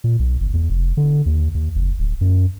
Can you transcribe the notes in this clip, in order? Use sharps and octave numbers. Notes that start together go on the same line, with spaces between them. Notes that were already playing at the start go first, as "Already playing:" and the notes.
A#2
B1
G1
E2
F1
D3
D#2
D#2
F#1
D1
F#2